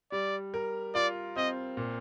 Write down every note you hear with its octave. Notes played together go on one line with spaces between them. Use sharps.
G3 D5
A#4
F4 D5
C4 D#5
A#2